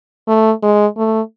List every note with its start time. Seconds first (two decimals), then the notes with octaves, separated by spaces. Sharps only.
0.28 A3
0.63 G#3
0.97 A3